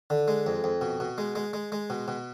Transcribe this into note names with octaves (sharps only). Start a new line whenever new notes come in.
D3
G#3
F2
F2
B2
B2
G#3
G#3
G#3
G#3
B2
B2